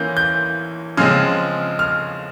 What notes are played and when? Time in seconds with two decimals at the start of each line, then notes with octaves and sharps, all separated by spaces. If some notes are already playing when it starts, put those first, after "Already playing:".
Already playing: E3 A#3 C#4 G6
0.17 G6
0.97 C#3 F3 G#3 C4 F6
1.79 F6